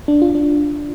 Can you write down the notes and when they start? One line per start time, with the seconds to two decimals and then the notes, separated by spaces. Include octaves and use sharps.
0.08 D4
0.22 F4
0.35 D4